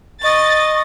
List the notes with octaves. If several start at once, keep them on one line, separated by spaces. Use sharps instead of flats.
D#5 C#6 A6